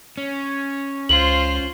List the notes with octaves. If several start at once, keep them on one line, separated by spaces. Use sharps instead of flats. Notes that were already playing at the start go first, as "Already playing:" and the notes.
C#4
C#2 F4 C5 F#7